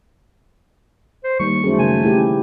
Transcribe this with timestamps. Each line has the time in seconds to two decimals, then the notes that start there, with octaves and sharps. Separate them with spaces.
1.24 C5
1.40 D#2 D#3 G3 A#3 C#6
1.64 F#2 A3 G#4 C5
1.79 C#3 A#3 G#5
2.03 A1 E4 G4